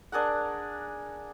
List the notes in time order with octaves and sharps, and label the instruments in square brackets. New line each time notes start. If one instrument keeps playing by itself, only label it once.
[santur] D4 G#4 A#4 F#5